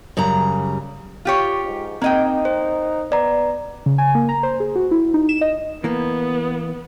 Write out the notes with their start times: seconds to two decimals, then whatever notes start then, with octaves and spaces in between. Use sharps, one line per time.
0.17 F#2 C#3 G3 A#5
1.25 F4 G4 C#5
1.65 G#2
2.02 A#3 C4 D#4 D#5 G5
2.45 C5
3.12 B3 D5 A#5
3.86 C#3
3.98 G#5
4.15 A#3
4.29 A#5
4.43 C5
4.60 G#4
4.75 F#4
4.91 E4
5.14 D#4
5.29 E7
5.41 D#5
5.84 E3 A#3 B3